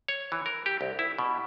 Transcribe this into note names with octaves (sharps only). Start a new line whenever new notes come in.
C#5
E3
A#4
G4
C2
E4
B2